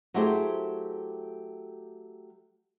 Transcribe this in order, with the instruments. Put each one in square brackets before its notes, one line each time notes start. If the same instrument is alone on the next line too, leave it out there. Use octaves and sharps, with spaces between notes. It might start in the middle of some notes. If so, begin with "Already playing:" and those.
[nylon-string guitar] F#3 A3 E4 G4 G#4 C5